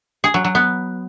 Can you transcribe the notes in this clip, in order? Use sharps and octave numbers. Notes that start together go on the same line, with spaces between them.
G#4
F#3
F#3
B3